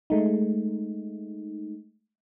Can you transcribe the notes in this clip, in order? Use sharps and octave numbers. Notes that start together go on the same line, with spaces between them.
G#3 A3 D#4